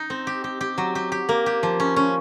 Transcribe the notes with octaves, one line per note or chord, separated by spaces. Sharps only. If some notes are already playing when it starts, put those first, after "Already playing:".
Already playing: D#4
C4
G4
G4
G4
F#3
G4
G4
A#3
G4
F3
C#4
C#4